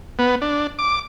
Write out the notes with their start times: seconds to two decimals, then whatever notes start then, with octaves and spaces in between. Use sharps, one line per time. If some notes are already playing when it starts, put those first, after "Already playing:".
0.19 B3
0.42 D4
0.79 D6